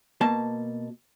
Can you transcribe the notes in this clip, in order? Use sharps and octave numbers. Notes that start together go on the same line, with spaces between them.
B2 A#3 A5